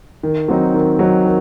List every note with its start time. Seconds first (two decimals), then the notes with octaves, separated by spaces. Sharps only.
0.23 D#3
0.48 F#3 C4 D#4
0.74 D#3
0.99 F#3 C4 D#4
1.25 D#3